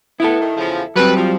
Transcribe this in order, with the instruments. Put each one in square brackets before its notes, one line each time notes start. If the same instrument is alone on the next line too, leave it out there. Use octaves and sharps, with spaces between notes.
[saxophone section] B3 [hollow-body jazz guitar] E4 A4
[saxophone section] D#3
E2 C#3 F3
[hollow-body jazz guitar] F#3 G3 C4 [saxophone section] A4 B4
[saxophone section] F3